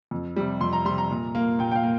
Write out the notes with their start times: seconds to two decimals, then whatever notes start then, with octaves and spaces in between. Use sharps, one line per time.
0.11 F2
0.36 C3 G3
0.61 F2 C6
0.73 A#5
0.85 C3 G3 C6
0.98 A#5
1.11 A#2
1.35 A#3
1.59 A#2 G5
1.72 G5
1.75 F5
1.83 A#3